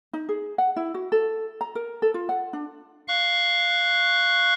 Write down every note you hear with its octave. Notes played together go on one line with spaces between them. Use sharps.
D#4
G#4
F#5
E4
F#4
A4
A#5
A#4
A4
F4
F#5
D4
F5 C#6 F#6